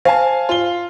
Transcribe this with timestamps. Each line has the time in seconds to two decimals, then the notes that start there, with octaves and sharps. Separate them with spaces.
0.05 C5 F5 G#5 A5
0.49 F4 G7